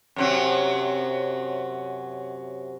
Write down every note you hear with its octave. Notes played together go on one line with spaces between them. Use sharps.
F#2 C3 F#3